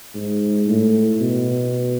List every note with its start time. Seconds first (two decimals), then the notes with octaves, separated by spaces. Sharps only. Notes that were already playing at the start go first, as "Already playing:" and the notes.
0.14 G#2
0.66 A2
1.20 B2